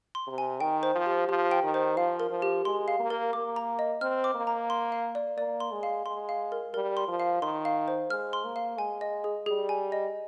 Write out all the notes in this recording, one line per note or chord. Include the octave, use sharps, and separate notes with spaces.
C6
C3
G#5
D#3 G5
C5
F3
G4
F3 G4
G5
D#3
C5
F3 F5
A#4
F3
G4
G#3 C6
F5
A#3
A#4
A#3 D6
A#5
D#5
C4 F6
D6
A#3
A#5
C6
F5
D5
A#3 D5
C6
G#3
F5
G#3 C6
F5
A#4
G3 A#4
C6
F3
F5
D#3 C6
F5
C5
G#3 F6
C6
A#3
F5
G#3 G#5
D#5
G#4
G3 G#4
G#5
D#5